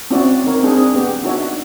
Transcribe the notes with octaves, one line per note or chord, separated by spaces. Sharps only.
C4 C#4 E4 F#4 D5
C4 D#4 A#4 C#5
C4 D4 G#4
B3 G4
B3 D4 D#4 F#4 C#5 E5